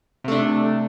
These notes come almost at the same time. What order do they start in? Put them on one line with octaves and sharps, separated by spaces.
C3 A3 D4